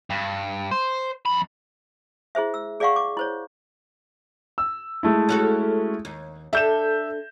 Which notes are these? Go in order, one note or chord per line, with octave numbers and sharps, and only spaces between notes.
G2
C5
F2 B5
E4 G#4 C5 E5
E6
G#4 D5 D#5 F5 F#5 C#6
D6
E4 C5 C#5
E6
G#3 A3 E4
C#4 F#4 A4
D#2
D4 A4 E5 G6 E7